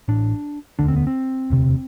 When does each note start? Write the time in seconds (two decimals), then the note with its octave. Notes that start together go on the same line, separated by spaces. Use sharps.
0.08 A1 A2 D4
0.79 E1 D2 D3 D4
0.88 C4
0.96 B3
1.07 C4
1.50 E1 D2 C3